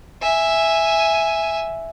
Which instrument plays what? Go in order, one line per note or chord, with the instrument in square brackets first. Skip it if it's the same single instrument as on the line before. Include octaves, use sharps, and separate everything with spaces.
[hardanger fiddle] E5 G#5